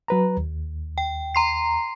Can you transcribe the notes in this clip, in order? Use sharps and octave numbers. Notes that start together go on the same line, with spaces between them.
F#3 B4 A#5
D#2
G5
A#5 C6 C7